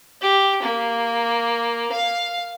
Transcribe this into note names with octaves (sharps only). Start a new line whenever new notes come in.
G4
A#3
F5